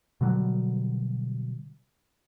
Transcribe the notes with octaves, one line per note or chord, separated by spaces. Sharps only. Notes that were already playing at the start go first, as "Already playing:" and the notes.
B2 D3 F#3 G3